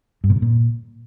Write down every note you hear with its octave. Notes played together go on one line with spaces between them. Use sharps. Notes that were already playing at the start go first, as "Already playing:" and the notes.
G2
A#2
C#3
A#2